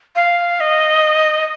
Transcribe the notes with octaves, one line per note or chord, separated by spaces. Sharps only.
F5
D#5